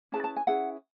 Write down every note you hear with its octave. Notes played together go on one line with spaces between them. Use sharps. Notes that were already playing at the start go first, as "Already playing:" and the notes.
C#4 E4 G#4 B4 A5
A5
G#5
C#4 E4 G#4 B4 F#5